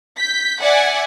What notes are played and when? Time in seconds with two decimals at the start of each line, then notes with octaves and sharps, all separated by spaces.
0.18 G6 B6
0.61 D5 E5 F#5 G#5